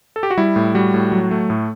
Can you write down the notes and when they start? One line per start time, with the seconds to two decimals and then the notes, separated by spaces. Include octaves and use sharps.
0.16 A4
0.23 G4
0.31 F#4
0.38 G3 E4
0.56 A2
0.75 G3 F#4
0.94 A2
1.12 F#3
1.31 A3
1.50 A2